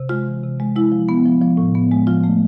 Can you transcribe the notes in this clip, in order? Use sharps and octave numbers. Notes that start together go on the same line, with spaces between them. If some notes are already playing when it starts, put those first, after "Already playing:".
Already playing: C3
G#3 F4
E3
C3
G#3
G#3 E4
F3
B3
F3
F3
A2
B3
G#3
F3 F4
A3